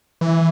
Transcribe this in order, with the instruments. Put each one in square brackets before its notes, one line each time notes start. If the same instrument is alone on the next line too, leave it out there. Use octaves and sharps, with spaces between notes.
[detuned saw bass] E3